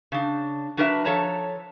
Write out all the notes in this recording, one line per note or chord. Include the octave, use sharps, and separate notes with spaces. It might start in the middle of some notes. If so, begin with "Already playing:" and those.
C#3 D4
F#3 D4 A#4 B4 C#5 E5
F3 A4 C#5 A5 A#5